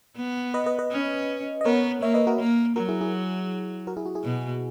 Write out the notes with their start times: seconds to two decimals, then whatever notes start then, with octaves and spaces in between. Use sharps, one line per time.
0.16 B3
0.54 B4 D#5
0.66 B4 D#5
0.79 B4 D#5
0.91 C#4
1.61 D#5
1.65 B3 A#4 C#5
2.02 A#3 C#5 E5
2.14 B4 D#5
2.27 F#4 A#4
2.39 A#3
2.76 F#3 F#4 A#4
2.89 E4 G#4
3.01 E4 G#4
3.87 F#4 A#4
3.97 E4 G#4
4.06 F#4
4.15 E4 G#4
4.24 B2